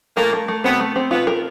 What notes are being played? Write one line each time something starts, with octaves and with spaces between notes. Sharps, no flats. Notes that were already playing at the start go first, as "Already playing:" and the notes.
A#2 A3 A#3
A3
A3
B2 B3 C4
A3
C4
B2 B3 F4
A#4